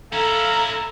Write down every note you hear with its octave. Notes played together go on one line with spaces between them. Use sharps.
C#4 E4 A4 F5 A#5